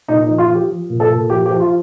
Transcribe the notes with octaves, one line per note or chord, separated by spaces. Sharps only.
A#2 D#4
D#4
F3
F4
F3
G4
F3
A#2
A4
A#2
F3 G4
G4
F3
F4